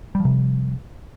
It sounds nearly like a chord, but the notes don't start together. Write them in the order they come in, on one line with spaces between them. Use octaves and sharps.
G3 F3 C3